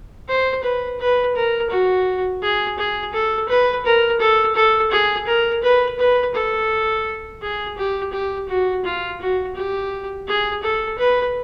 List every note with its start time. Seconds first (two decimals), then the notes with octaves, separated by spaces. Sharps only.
0.28 C5
0.63 B4
0.99 B4
1.35 A#4
1.70 F#4
2.42 G#4
2.78 G#4
3.13 A4
3.49 B4
3.85 A#4
4.20 A4
4.56 A4
4.91 G#4
5.27 A#4
5.63 B4
5.99 B4
6.35 A4
7.42 G#4
7.77 G4
8.12 G4
8.48 F#4
8.84 F4
9.20 F#4
9.55 G4
10.27 G#4
10.63 A4
10.98 B4